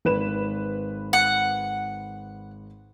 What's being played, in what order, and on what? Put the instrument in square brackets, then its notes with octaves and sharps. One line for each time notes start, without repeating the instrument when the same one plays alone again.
[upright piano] G#1 B4 E7
[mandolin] F#5